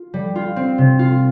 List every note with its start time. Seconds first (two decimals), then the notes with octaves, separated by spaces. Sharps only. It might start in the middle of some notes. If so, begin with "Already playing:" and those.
Already playing: F4
0.14 G3
0.35 F4
0.56 C4
0.78 C3
0.99 F4